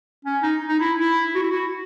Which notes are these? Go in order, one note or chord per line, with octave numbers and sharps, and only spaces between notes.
C#4
D#4
D#4
E4
E4
F#4
E4
F#4